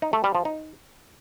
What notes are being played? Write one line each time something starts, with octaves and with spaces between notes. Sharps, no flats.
D#4
A3
G3
F3
D#4